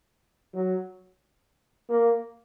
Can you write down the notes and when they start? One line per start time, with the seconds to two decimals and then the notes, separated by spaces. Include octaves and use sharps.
0.54 F#3
1.89 A#3